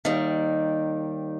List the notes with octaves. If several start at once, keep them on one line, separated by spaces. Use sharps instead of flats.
D#2 D#3 G3